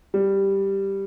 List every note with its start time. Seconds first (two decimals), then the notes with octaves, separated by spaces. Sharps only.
0.14 G3